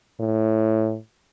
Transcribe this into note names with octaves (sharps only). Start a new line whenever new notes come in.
A2